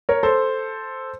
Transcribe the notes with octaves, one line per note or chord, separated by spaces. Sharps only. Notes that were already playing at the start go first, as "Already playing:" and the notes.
A#4 C#5
A4 C5